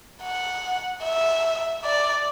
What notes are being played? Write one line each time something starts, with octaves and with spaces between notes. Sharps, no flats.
F#5
E5
D5